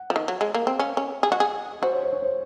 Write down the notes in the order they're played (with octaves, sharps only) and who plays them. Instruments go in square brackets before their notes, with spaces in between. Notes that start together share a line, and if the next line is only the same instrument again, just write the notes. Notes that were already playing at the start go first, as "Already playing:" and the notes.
Already playing: [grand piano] F#5
[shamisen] F3
D#3
F#3
G#3
A#3
C4
[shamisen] C#4 [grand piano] F5
[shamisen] C#4
G#4
[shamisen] F#4 [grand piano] D#5
[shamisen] G#4
[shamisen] F#4 [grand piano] C5
[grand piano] C#5
C5
C#5
C5